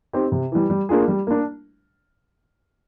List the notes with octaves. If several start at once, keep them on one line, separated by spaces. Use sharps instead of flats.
C4 D#4 G4
C3
E3 G3
G3
A#3 D4 F4 G#4
G3
A#3 D4